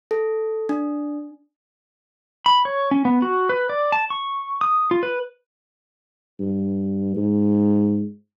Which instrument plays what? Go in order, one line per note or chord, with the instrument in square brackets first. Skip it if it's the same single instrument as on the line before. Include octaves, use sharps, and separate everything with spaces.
[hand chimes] A4
D4
[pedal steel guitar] B5
C#5
C#4
B3
F#4
B4
D5
A5
C#6
D#6
F4
B4
[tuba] G2
G#2